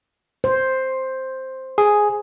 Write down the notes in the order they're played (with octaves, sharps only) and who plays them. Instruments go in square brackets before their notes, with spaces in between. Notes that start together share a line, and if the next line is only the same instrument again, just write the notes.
[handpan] C5
[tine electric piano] G#4